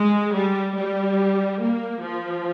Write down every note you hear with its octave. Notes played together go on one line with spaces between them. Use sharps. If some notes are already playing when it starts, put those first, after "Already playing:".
Already playing: G#3
G3
G3
A#3
F3